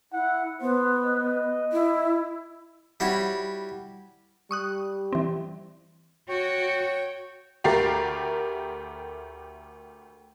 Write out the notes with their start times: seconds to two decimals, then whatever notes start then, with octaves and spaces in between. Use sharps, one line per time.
0.13 E4 F#5
0.61 B3 C5
1.04 D#5
1.73 E4
3.00 G3 E4 F#4 C#5
4.51 G3 C#6 D#6 F#6
5.13 E3 C4
6.29 F#4 C#5 G5
7.64 D2 A3 G4 A#4 A6 C7